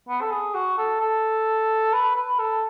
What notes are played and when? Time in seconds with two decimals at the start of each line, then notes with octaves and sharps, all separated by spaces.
0.08 B3
0.21 A4
0.31 G#4
0.54 F#4
0.77 A4
1.00 A4
1.92 B4
2.16 B4
2.39 A4